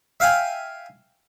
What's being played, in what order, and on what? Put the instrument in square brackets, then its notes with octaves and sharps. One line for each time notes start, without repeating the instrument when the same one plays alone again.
[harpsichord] E5 F5 G5 G#5